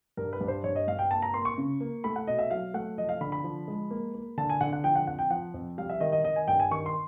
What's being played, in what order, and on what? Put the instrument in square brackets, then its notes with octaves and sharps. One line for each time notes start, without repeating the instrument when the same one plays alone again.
[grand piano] G2 A#4
B4
G2
C5
G2 C#5
D#5
G2 F5
G5
A#3 A5
A#5
A#3 C6
C#6
C#3
A#3
A3 B5
F#5
B2 D#5
E5
F#3 F5
A3 F#5
F3 D#5
F5
D3 B5
B5
F3
G#3
A#3
A#3
D3 A5
G#5
D3 F#5
F#5
F3 G5
F#5
F2 F#5
G5
F3 F#5
F2
G3 F5
E5
D#3 D#5
D#5
D#3 D#5
G#5
G2 G5
G#5
D#3 C#6
C6